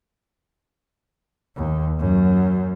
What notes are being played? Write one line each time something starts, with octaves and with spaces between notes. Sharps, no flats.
D#2
F#2